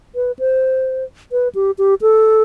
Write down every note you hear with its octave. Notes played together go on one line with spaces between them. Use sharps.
B4
C5
B4
G4
G4
A4